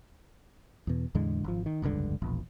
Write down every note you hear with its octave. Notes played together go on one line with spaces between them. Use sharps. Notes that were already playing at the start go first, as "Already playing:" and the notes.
E2 B2
E2 A2 D3 G#3
G#1 F3
D#3
F1 C#2 G2 D3
E1 A#1